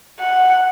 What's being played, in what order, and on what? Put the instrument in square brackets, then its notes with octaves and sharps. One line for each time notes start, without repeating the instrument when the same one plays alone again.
[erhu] F#5